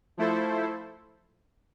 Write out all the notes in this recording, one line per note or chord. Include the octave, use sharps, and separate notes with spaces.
F3 A3 E4 A4 C5